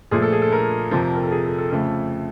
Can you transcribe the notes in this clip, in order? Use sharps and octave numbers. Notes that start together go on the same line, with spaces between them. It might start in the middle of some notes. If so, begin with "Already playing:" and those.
A#2 F3 A3 G#4
A4
G#4
A4
A#4
F2 C3 F3
A#4
A4
G#4
A4
A4
F2 C#3 F3 A3 A4